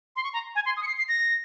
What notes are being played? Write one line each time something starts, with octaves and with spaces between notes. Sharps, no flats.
C6
C#6
A#5
G#5
C6
D#6
C#7
C7
C7
A#6